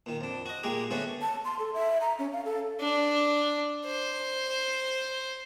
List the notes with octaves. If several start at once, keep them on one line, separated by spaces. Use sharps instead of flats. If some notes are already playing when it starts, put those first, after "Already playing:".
A#2 D#3
F2 D4
F#4 D#5
A#2 G#3 A#3 G4 G#4
D3 G#3 A3 B3 C#4 F#4
A5
C6
A4
E5
A#5
C#4
F5
A4
D4
C5